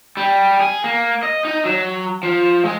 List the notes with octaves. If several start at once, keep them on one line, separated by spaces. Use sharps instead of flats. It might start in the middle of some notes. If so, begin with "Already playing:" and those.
G3
G#4
A#3
D#5
D#4
F#3
F3
G#3